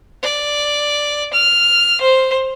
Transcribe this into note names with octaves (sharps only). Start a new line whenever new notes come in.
D5
F6
C5